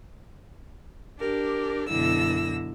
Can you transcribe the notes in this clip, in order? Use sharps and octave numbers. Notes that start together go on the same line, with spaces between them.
D4 G4 A#4
F#2 B2 D3 E4 E6 A#6